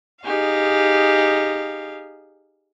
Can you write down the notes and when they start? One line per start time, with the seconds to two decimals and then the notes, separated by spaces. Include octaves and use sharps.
0.25 D#4 G4 G#4 F5